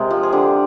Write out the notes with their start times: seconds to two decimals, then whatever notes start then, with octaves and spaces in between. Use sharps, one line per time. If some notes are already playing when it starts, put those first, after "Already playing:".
Already playing: C3 G#3 A#4
0.10 F3
0.23 G#4
0.32 D3 G4